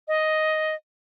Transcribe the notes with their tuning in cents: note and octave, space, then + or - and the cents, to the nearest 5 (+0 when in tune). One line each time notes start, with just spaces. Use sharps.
D#5 +5